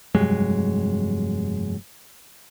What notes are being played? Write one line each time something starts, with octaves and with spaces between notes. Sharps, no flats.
F1 G2 F#3 G#3